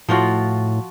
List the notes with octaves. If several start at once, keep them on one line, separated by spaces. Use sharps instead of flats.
A2 F3 F4 F#4